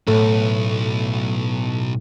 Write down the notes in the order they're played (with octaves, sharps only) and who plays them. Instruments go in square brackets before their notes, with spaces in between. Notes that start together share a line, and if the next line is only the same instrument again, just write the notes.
[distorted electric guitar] B1 [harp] A2 [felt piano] A3